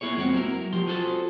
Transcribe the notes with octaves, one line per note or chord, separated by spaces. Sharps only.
A#3 B3 D4 E4 G#4 C#5
F2 G#3 C4 F#4
F#3 A#3 E4 A#4
F3 G4 C6
F4 F#4 G#4 A4 C5